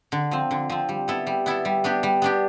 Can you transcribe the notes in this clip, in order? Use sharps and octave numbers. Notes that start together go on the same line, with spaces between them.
D3
F3 C4
D3
F3 C4
G3
B3 E4 A4
G3
B3 E4 A4
G3
B3 D4 G4
G3
B3 D4 G4